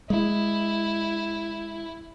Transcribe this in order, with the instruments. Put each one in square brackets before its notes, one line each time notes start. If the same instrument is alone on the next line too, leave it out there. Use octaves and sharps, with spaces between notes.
[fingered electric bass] G#3 [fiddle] E4